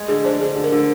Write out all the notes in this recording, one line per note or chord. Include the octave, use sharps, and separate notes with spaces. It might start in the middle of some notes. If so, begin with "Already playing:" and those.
Already playing: G#3
D3 G#4
D4 C5
D3 G#4
D3
A#4
D3